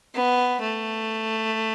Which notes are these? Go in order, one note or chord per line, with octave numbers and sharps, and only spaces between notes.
B3
A3